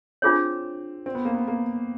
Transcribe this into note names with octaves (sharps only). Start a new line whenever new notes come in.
C4 D4 F4 G#4 C#5
C4
B3
A#3
B3
A#3